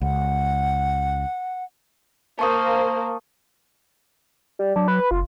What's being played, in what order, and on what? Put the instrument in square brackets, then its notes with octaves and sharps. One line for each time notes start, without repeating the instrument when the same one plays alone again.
[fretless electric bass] C#2 [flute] F#5
[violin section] A#3 C5 [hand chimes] A5 C#6 D#6
[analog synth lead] G3
[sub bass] F#3 [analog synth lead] D4
[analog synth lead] B4
[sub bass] F#1 [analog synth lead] F4